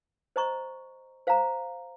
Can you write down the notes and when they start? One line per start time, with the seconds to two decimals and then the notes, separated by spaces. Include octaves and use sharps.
0.36 C5 D#5 A#5 C#6
1.27 C5 F5 A#5